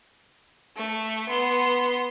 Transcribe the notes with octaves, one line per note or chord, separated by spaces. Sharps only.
A3
B3 C6